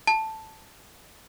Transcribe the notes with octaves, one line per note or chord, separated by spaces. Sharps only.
A5